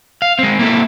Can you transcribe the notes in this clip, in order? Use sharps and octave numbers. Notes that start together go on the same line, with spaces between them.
F5
G#3 C4
A#3 C4 E4 A4